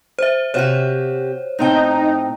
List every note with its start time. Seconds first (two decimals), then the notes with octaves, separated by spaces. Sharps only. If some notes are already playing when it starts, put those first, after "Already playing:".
0.19 C5 E5
0.54 C3 F#4 G4 C5 C#5
1.59 A2 C4 D#4 G5